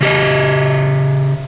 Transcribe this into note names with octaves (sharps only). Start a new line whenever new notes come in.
C#3 G4 D#5